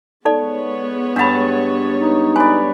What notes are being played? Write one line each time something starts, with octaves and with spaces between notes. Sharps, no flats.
G#3 B3 D#4 A4 C#5 D5
G2 D4 F#5 A5 B5
D#4
B4 D5 G#5